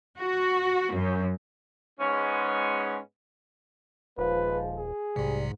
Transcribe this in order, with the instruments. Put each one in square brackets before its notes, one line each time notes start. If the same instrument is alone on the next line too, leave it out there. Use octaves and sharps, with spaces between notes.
[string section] F#4
F#2
[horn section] G#2 G#3 B3 C#4
[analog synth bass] D#1 [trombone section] F3 G#3 [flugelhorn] B4
[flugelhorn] G#4
[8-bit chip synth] B1 C3 [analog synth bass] G#2 [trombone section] G3